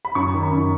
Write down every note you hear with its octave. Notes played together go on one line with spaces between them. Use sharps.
B5
F#2 C#6
D#3
B5
F#2